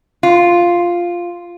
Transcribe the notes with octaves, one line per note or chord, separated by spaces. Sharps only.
F4